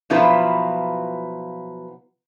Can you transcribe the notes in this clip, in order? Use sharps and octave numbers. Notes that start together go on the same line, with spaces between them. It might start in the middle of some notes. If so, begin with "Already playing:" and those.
B2 F3 F#3 E4 F4 B4